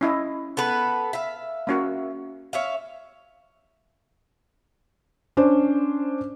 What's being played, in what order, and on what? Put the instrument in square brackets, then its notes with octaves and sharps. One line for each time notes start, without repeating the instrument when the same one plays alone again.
[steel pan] C#4 E4 D#5
[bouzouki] B3 A4 B4
E5 F5
[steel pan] A#3 C#4 F#4
[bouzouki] C#5 E5 F5
[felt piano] C#4 D4 C5